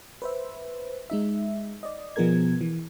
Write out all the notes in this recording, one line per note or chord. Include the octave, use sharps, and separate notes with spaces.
B4 C5 E5
G#3 D#4 E5
D5 D#5
B2 F3 B3 G#4 A#4 G#6
E3